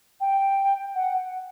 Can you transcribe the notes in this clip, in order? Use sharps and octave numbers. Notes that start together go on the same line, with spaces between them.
G5
F#5